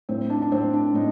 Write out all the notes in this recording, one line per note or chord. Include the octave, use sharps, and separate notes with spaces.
A2 C4
D4
D4
A2 C4
D4
A2 D#4